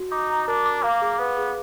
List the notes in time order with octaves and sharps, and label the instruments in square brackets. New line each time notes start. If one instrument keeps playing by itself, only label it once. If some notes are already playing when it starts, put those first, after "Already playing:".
Already playing: [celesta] F#4
[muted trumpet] D#4 [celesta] D6
[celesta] A#5
[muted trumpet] D4 [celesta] A#4
[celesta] D6
[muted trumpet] A#3 [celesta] F5
[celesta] G#4
[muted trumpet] B3 [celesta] B4
[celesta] G#4